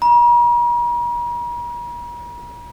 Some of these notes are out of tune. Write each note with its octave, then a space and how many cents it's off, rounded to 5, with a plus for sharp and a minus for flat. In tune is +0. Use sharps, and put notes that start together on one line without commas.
A#5 +45